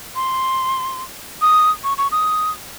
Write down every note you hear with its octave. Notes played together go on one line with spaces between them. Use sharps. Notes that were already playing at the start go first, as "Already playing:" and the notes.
C6
D#6
C#6
C#6
D#6